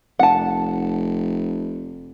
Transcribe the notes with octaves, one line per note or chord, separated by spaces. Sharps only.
F1 F#5 A5